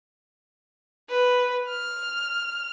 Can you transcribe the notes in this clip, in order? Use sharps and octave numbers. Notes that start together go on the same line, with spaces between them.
B4
F6